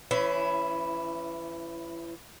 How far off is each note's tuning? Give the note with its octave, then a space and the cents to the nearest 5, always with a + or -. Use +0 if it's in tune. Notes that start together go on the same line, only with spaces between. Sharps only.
E3 +30 C#4 +10 E4 +0